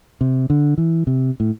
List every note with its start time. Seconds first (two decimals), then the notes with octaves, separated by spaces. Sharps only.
0.21 C3
0.50 D3
0.78 E3
1.07 C3
1.40 A2